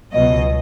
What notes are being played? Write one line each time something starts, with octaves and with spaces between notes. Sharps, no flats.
C#2 B2 F#3 D#5